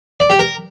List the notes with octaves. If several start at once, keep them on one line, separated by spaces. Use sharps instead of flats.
D5
G4
A#4